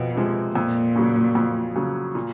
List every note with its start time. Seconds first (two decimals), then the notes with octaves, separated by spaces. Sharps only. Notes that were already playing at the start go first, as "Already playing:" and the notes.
Already playing: F2 B2 F3
0.16 C3 F3 G#3
0.55 F2 A#2
0.96 C#3 F#3
1.35 F2
1.75 C#3 F#3
2.15 A#2